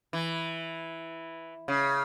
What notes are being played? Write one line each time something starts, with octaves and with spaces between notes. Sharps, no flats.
E3
C#3